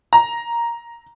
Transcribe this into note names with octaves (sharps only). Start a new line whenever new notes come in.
A#5